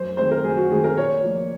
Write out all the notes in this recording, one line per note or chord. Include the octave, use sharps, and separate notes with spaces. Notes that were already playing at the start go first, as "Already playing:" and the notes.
Already playing: F#2 C5
D#3 G#3 C4 C5
A#4
F#2 G#4
F#4
D#3 G#3 C4 G#4
A#4
A#2 C#5
F3 A#3